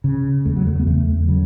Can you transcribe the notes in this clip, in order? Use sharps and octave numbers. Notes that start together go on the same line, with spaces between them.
C#3
E2 A3
F#3
A3
B3
E2 A3
C#3 F#3